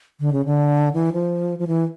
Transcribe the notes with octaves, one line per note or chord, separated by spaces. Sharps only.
D3
C#3
D3
E3
F3
F3
E3